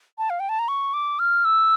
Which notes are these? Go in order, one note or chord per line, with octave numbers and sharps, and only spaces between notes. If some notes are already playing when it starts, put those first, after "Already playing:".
A5
F5
G5
A5
A#5
C#6
D6
F6
E6